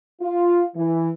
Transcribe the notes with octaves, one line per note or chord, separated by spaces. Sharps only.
F4
E3